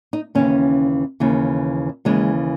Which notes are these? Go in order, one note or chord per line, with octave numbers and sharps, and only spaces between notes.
D#4
D#2 C#3 E3 C#4
D#2 C#3 E3
D#2 C#3 E3 G#3